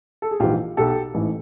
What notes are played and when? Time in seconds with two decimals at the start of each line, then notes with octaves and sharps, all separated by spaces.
0.22 A4
0.31 G#4
0.40 A#1 G#2 E3 F4 G4
0.77 B1 B2 G4 A4
1.14 A1 G#2 E3